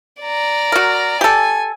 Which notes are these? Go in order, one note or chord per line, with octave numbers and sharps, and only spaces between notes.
D5 A#5
F#4 A#4
G4 A4 G#5